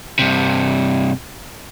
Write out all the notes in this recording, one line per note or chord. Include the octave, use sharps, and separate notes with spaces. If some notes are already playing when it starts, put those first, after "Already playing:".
G2 C3